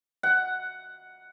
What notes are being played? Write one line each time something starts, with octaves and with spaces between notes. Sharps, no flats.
F#5